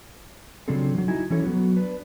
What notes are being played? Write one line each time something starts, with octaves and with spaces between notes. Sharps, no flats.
C#3 F#3 C4 D4 F4 A4
D#3 F#3
D#4 E4 F#4 G#5
E3 F#3 C#4 E4 A4 C#5
F#3 B3 F#4
D4 B4